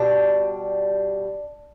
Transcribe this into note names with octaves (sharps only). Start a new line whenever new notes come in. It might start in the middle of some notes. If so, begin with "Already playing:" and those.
Already playing: B2 G3 D4